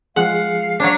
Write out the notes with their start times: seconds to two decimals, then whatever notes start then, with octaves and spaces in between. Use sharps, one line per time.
0.16 F3 G#3 G#4 F5 F#5
0.80 F#3 D4 C#5 A#5